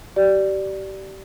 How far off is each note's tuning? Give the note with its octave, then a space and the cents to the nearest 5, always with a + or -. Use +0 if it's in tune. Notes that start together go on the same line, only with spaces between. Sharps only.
G4 -30 D5 +0